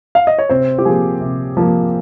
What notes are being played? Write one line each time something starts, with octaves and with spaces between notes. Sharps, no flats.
F5
D#5
C#5
C3 C4 C5
G4
F3 A#3 G#4
C3
F3 A#3